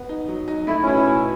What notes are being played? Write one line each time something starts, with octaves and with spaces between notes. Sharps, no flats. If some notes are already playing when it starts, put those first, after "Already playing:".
Already playing: B3
D#4
F#3
D#4
A3 E4
B2 C#4 E4
B2